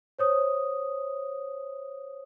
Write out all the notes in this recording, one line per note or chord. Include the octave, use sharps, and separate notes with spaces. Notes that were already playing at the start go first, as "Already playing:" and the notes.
C5 C#5 D#6